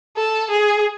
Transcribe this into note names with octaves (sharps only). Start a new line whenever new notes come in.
A4
G#4